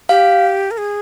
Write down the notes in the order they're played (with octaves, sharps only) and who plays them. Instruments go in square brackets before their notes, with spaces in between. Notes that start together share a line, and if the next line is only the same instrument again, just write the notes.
[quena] G4 [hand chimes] F5
[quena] A#4
G#4